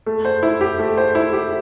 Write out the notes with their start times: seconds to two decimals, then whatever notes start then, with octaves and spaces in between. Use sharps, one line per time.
0.06 A3
0.25 C5
0.43 E4
0.61 G4
0.79 A3
0.97 C5
1.15 E4
1.33 G4